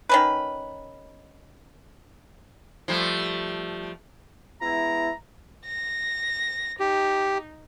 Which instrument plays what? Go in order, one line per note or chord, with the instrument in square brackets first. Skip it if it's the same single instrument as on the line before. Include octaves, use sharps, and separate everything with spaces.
[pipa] D#3 C#4 B4
[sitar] F3 G3 A3
[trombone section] G#3 B3 E4 [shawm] A#5
[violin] A#6
[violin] D#4 [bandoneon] G4